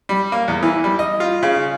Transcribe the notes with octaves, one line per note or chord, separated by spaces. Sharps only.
G3
A#3
E2
E3
G3
D#5
F4
C#3